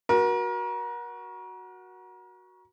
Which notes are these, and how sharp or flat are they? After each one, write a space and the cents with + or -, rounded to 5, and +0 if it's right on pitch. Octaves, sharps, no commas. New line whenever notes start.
F#4 +0 A#4 +35